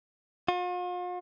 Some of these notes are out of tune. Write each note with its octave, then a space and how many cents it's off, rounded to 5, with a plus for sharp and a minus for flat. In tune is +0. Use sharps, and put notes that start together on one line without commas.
F4 +45